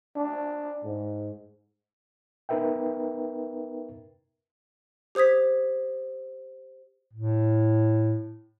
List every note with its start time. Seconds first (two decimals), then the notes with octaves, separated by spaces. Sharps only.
0.16 D4
0.84 G#2
2.49 B3 D#4 A#4 B4 E5 G5
5.15 G4 C5 D#6 G#6 B6
7.14 A2